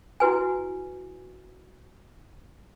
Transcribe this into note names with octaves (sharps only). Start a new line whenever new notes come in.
E4 F#4 B4 G#5